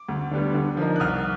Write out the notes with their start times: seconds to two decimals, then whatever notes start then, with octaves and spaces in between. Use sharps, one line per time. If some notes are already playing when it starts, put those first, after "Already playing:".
Already playing: D6
0.08 D2
0.31 D3 G3 B3
0.54 D3
0.77 F3 A#3 D#4
0.96 F#6
1.00 C2 D#6 F6